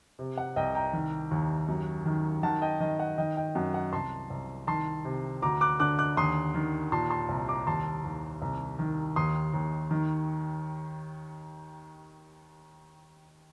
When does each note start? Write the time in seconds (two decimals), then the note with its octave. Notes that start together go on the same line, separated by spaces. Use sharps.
0.19 C3
0.38 F#5
0.56 C2 D#5 G5
0.75 G5 A#5
0.93 D#3
1.31 D#2
1.69 F#2
2.06 D#3
2.43 D#3 F#5 A5
2.62 D#5 G5
2.80 D#3 D#5
3.00 F#5
3.18 D#3 D#5 G5
3.37 D#5 G5
3.55 F#2 F#5
3.74 F#5
3.92 C2 A5 C6
4.30 C2
4.67 D#3 A5 C6
5.05 C3
5.42 D2 A#5 D6
5.61 D6 F#6
5.80 D3 D6 F#6
5.99 D6 F#6
6.17 D#2 C6 D#6
6.54 D#3
6.92 A#2 A5 C6
7.11 A5 C6
7.29 C2
7.48 A#5 D6
7.67 D#2 A5 C6
8.04 D#2
8.42 C2
8.79 D#3
9.16 D#2 C6 D#6
9.54 D#2
9.91 D#3